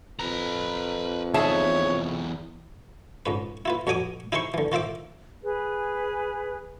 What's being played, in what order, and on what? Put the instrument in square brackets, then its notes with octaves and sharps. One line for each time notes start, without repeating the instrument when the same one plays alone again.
[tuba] F2 [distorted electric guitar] B4 A#5
[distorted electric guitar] E2 D#4 [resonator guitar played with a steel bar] G#4 E5 A5 [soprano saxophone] C#5
[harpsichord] C#2 G#2 B4
E4 F4 B4
F2 B2 F#3 G#5 D6 D#6
D#4 E4 G#4 C5 C6 C#6
D3 E3
D#3 F4 C5 E5 D6
[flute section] G#4 B4